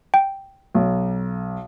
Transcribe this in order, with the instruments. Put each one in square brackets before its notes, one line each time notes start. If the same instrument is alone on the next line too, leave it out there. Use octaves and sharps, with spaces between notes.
[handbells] G5
[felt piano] B1